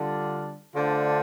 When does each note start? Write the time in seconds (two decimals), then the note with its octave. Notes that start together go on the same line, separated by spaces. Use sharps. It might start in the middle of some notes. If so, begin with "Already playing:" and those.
Already playing: D3 G3 D4 F4
0.75 D3 A3 D4 F4 C5